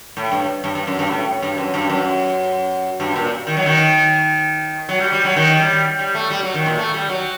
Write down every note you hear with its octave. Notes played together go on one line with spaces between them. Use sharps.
A2
G2
G2
G2
F#2
G2
A2
G2
F#2
G2
F#2
G2
A#2
D#3
F#3
D#3
F#3
G3
G3
F#3
D#3
G3
G3
A3
G3
F#3
D#3
A#2
A3
G3
F#3